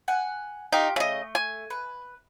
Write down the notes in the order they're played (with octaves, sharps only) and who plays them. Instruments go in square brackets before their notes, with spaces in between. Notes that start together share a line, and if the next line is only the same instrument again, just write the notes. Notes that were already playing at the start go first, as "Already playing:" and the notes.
[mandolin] F#5 G#5
[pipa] D#4 [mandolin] F4 G4
[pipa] C#3 D#5 [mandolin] A3
[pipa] G#5
[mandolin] B4